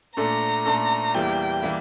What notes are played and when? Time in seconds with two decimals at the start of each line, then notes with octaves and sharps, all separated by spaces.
0.17 A#2 A3 D4 A4 A#5
0.66 A#2 A3 D4 A4
1.14 E2 E3 G3 A#3 E4 G5
1.63 E3 G3 A#3 E4